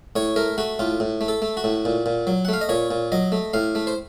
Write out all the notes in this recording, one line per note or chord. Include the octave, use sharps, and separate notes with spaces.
A2 C#5
A3 A#4
A3 F#4
A2 F4
A2
A3
A4
A3
F#4
A2
A#2
A#2
F#3
F#5
A3 F5
D#5
A#2 C#5
A#2
F#3 D#5
A3
A2 F5
A3
C5